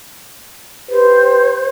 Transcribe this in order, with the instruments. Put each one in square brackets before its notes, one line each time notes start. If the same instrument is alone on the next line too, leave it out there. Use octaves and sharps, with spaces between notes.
[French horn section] G4 B4 [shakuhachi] C5